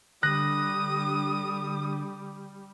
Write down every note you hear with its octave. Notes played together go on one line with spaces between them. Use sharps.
D3 G3 D#6 F#6 A#6